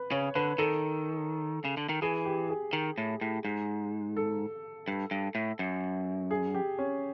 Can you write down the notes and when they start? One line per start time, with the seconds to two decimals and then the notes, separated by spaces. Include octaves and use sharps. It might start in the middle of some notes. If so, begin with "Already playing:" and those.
Already playing: B4
0.11 C#3 C#5
0.35 D3 B4
0.58 D#3 A4
1.65 C#3
1.77 D3
1.89 D#3
2.02 E3 G#4
2.25 G4
2.49 G#4
2.73 D#3
2.98 A2
3.21 A2
3.45 G#2
4.17 A4
4.88 G2
5.11 G2
5.35 A2
5.59 F#2
6.31 G#4
6.54 G4
6.79 C#4